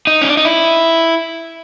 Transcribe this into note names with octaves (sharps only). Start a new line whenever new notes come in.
D#4
C#4
D4
D#4
E4